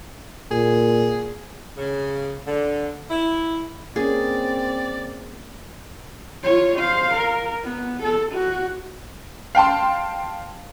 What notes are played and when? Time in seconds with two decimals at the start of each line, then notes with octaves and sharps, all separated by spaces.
0.51 A#2 G#4
1.78 C#3
2.47 D3
3.10 E4
3.96 A#3 C4 C#4 G#4 D5
6.44 F4 C#5
6.77 C5 F5
7.13 A#4
7.64 B3
8.03 A4
8.32 F#4
9.55 F5 G5 A5 C6